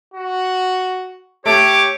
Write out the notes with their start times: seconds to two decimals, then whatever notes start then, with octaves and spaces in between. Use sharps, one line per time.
0.14 F#4
1.46 A3 G4 C#5 D6